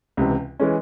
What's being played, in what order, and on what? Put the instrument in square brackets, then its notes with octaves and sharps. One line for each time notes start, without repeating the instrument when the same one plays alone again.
[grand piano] C#2 C3 E3
E3 G#3 C#4